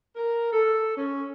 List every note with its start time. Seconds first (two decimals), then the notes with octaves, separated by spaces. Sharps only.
0.15 A#4
0.51 A4
0.96 C#4